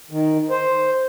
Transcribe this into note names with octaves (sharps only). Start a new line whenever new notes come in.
D#3
C5